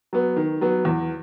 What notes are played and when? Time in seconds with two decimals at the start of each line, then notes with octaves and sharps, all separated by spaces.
0.13 F#3 B3
0.36 D#3
0.61 F#3 B3
0.85 E2